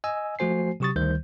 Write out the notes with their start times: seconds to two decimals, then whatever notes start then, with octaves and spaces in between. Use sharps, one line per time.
0.04 D#5 G#5 E6
0.39 F3 A3 F#4 C5 G#5 C7
0.80 C3 F#3 G4 C#6 D#6 A6
0.96 D2 D#3 G3 C5 G6